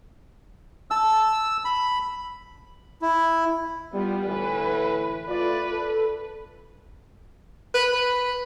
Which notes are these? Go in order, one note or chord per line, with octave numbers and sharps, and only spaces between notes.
A5 E6
B5
E4
G3 B3 F4
A2 D3 E3 B4
A3 F4 B4 D5
A4
B4
B4